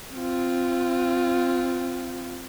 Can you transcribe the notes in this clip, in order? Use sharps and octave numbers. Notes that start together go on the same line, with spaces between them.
C4 F4